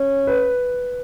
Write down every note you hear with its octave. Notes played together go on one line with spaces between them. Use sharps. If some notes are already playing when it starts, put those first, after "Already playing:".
Already playing: C#4
B4